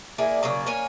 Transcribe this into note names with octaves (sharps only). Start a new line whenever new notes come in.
A#3 E4 G#4 D5
C#3 F#3 A#3 D5
A#3 C#4 C#5 G#5